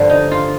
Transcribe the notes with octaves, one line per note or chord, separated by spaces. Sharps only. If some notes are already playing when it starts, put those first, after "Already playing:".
Already playing: G2 D3 F3
D#4
F4